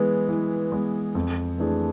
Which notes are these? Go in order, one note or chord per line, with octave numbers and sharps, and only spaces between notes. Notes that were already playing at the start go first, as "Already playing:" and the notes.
Already playing: E3 G#3 B3
E3
G#3 B3
F2
E3 A3 D4 G#4